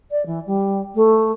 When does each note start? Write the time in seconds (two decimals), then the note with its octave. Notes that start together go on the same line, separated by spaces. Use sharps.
0.11 D5
0.26 E3
0.46 G3
0.94 A3